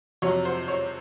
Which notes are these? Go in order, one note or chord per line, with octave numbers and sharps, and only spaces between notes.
F2 C3 F#3 C#5
C5
C#5